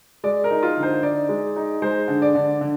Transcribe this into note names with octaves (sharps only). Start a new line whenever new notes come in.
G#3 D5
A#4
D#4
F4
D3
C5
D#4 D5
G#3
D#4
G#3 C5
D3
D5
D3
D3